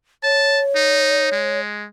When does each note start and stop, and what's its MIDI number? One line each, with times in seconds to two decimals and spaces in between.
0.24 1.60 73
0.24 0.61 81
0.76 1.29 63
1.32 1.87 56